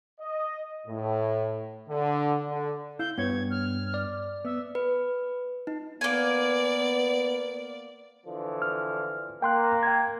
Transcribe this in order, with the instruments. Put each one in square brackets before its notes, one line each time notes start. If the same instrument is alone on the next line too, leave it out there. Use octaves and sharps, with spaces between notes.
[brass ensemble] D#5
A2
D3
D3
[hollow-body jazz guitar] E4 F5 [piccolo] G6
[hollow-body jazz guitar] G2 C#5 [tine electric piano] B3 B4 [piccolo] G#6
[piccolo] F6
[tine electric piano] D5
[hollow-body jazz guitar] B3 [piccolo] E5
[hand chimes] B4
D#4
[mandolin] A#3 G#5 [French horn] B3 [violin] D5
[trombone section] D3 E3 F3
[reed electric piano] F6
[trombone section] A#3 [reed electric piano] G5 C6 F#6
[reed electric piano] G5 G#6